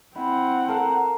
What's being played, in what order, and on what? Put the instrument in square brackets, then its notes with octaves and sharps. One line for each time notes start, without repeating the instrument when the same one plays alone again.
[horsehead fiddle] C4 F#5 [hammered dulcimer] E4
[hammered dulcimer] A4 A#4 F5